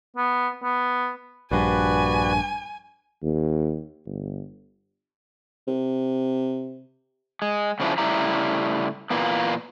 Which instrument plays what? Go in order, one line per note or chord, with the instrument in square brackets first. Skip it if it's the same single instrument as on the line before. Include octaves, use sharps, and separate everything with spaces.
[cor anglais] B3
B3
[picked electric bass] A#1 G2 [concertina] F#4 B4 D5 [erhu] G#5
[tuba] D#2
G1
[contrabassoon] C3
[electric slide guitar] G#3
C#3 F3 C#4 D4 E4
A2 C#3 G3 E4 A#5
A#2 E3 A#3 B3